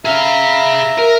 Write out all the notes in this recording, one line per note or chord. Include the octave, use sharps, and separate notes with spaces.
G#4 E5 F5 A#5
A#4